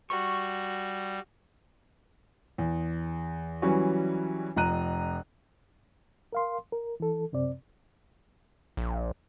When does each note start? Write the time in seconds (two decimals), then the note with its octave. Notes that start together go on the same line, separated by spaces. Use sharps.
0.10 G3 F#4 C#6
2.58 E2
3.62 E3 F#3 G3 C#4 F#4
4.56 F1 F2 A#5 F#6 D#7
6.33 A#4 F5 C6
6.72 A#4
7.00 E3 A4
7.32 F#2 C3 C4 D5
8.77 A#1